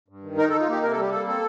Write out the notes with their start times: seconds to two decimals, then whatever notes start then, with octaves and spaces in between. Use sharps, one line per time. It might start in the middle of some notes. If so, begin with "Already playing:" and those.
0.08 G2
0.23 D#3
0.38 D#4 A#4
0.49 A4
0.53 D#4
0.60 F4
0.68 A#3 G4
0.82 C3 A#4
0.92 A4
0.98 G3 G4
1.11 A#3 A4
1.27 C4 A4